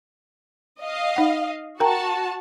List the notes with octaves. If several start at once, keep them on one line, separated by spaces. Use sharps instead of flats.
D#5 F5
D#4 F#5
F#4 A#4 G5 A5 A#5